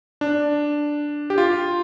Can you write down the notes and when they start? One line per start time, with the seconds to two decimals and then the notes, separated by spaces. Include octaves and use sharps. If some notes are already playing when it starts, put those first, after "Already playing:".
0.21 D4
1.30 G4
1.38 F4